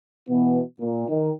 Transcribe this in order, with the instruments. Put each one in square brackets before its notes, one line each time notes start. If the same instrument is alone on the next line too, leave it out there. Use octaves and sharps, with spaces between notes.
[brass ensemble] B2 E3 B3
A#2
D#3